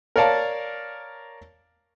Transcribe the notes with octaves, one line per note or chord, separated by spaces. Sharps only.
A#4 C#5 D5 F5 A5 A#5